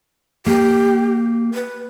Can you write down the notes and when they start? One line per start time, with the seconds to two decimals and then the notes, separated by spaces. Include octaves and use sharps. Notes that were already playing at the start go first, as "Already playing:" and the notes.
0.46 A#3 G4
1.54 B4